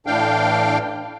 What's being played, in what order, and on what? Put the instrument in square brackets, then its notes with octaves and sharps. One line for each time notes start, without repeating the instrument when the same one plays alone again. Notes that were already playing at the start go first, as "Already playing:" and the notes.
[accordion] A2 E3 D4 F5 G5